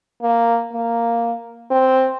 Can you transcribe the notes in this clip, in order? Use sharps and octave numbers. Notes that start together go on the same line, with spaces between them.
A#3
A#3
C4